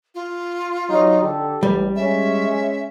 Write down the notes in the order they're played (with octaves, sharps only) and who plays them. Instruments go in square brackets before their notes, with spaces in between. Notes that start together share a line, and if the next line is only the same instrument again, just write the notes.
[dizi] F4
[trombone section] F#3 D#4
D3 G4 A4
[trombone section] A1 [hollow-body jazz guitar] G3
[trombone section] G#3 C#4 [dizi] E5